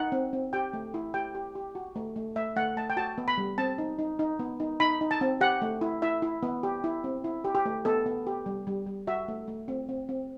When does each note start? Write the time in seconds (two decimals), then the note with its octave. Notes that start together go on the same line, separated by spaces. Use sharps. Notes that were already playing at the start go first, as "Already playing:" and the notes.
Already playing: D#4 F#5
0.12 C4
0.33 C4
0.53 G4 G5
0.73 A3
0.94 E4
1.14 G4 G5
1.35 G4
1.55 G4
1.75 F#4
1.96 A3
2.16 A3
2.36 A3 E5
2.56 A3 F#5
2.77 A3 A5
2.90 G5
2.97 F#4 A5
3.18 B3
3.28 B5
3.38 G3
3.58 C4 A5
3.78 D#4
3.99 D#4
4.19 D#4
4.39 B3
4.60 D#4
4.80 D#4 B5
5.01 D#4
5.11 A5
5.21 C4
5.41 G4 F#5
5.62 A3
5.81 E4
6.02 E4 E5
6.22 E4
6.43 B3
6.63 G4
6.84 E4
7.04 C4
7.24 E4
7.44 G4
7.55 G4
7.65 A3
7.85 B3 A4
8.06 B3
8.27 G4
8.46 G3
8.67 G3
8.87 G3
9.07 F#4 E5
9.28 A3
9.48 A3
9.68 C4
9.89 C4
10.09 C4